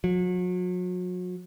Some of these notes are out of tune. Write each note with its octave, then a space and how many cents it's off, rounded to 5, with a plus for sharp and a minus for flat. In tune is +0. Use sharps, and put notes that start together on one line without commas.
F#3 -40